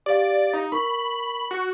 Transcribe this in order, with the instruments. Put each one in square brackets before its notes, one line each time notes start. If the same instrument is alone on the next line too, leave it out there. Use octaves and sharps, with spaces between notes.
[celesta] G4 F5 [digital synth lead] D5
[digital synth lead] D#4
[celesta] A#4 C#6 [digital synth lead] B5
[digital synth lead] F#4